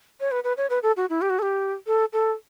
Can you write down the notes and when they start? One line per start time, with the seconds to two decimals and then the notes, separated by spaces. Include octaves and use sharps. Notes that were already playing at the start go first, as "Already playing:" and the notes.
0.20 C#5
0.31 B4
0.44 B4
0.57 C#5
0.70 B4
0.83 A4
0.97 F#4
1.10 E4
1.21 G4
1.30 F#4
1.39 A4
1.42 G4
1.87 A4
2.13 A4